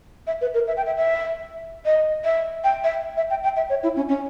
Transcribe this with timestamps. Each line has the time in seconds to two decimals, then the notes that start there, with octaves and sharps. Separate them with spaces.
0.27 E5
0.41 B4
0.54 A#4
0.68 E5
0.77 G5
0.86 E5
0.96 E5
1.86 D#5
2.25 E5
2.64 G5
2.84 E5
3.17 E5
3.30 G5
3.43 G5
3.56 E5
3.69 C#5
3.83 E4
3.96 C#4
4.09 C#4